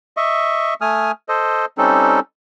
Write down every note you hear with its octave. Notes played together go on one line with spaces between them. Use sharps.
D#5 E5 C#6
A3 G#5 D#6 F6
A4 C5 D#5
G3 C4 C#4 D#4 A4